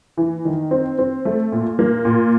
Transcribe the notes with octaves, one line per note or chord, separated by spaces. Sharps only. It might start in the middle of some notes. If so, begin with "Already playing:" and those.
E3
D#3
C4
C4
A3
A#2
A#3
A#2